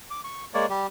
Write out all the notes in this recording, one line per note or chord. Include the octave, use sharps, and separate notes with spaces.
D6
C#6
G#3 A#3 C#5 D5
G3 G4